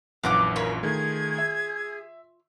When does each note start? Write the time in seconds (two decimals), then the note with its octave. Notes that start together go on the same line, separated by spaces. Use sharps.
0.23 A#1 F#2 E3 F5 F#5 D6
0.56 F4 A#4 C#5 B5
0.83 D#3 A3 G#4 G#6
1.38 E5